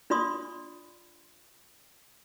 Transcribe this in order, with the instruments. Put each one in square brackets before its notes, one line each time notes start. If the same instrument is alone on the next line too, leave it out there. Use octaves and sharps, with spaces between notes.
[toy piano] D4 F4 D5 C6 D#6